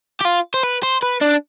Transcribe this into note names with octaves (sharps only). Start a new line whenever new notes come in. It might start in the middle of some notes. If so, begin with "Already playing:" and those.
G4
F4
C5
B4
C5
B4
D4